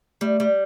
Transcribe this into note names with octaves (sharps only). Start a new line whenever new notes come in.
G3 A3
G3